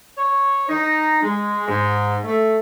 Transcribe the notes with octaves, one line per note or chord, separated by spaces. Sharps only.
C#5
D#4
G#3
G#2
A3